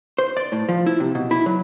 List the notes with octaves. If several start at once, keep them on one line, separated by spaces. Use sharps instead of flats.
C5
D5
A2
F3
E4
C3
B2
E4
F#3